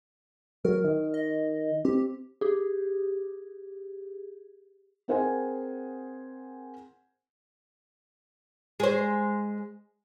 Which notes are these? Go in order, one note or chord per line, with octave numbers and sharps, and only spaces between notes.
F#3 A#4
D#3
D#5
C4 G4
G4 G#4
C4 G#4 A#4 C5 F#5 G#5
G#3 C5